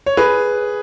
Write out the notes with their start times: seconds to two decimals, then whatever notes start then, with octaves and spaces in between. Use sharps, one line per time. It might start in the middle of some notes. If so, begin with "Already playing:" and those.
0.06 C#5
0.17 G#4 B4